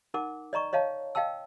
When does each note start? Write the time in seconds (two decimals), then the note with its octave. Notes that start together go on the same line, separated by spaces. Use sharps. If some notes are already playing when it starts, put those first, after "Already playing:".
0.14 D#4 A#4 F#5 D6
0.53 D5 D#5 A#5 C#6
0.73 C#5 D#5 F5 A5
1.15 D#5 F5 G5 A5 E6